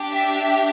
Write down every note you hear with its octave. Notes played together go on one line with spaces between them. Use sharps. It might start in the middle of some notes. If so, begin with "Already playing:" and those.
Already playing: D4 G4
E5